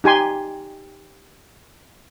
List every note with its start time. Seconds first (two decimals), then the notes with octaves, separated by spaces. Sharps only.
0.04 D#4 G4 G#5 C6